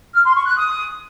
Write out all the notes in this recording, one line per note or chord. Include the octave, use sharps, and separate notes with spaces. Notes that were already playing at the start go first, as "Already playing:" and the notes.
F6
C6
C#6
F#6
D#6